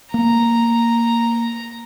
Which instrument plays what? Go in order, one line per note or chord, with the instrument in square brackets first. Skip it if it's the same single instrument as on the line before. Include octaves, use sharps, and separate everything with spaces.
[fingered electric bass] A#3 [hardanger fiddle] A#5